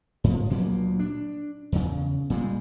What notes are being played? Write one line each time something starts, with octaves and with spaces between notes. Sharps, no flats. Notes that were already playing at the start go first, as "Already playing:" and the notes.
G#2 F3
D2 A#2 F#3 A#3
D4
E2 C#3
A#2 G3 G#3